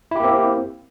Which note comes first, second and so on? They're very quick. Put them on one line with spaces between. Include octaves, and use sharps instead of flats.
E4 G4 A#3 C4